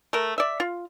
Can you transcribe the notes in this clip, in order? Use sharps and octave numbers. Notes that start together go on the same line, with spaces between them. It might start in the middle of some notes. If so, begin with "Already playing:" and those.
A3 A#4
D5 E5
F4